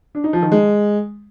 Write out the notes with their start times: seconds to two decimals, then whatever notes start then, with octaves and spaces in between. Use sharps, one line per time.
0.15 D4
0.24 D#4
0.33 F3
0.42 D#3
0.52 G#3